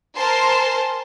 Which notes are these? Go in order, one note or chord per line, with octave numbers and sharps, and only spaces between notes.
A#4 C5 G#5 A5 C6